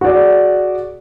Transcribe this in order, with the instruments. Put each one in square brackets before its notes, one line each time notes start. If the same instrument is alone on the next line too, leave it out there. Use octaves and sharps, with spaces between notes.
[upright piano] F#4 G#4 D5